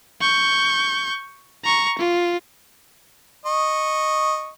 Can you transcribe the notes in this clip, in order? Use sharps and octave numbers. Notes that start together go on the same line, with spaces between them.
C#6 G6
A#5 C#6
F4
D#5 C#6